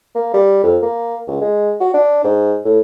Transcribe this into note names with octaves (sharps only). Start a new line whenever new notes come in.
A#3
G3
F2
A#3
C#2
G#3
F#4
D4
G#2
A2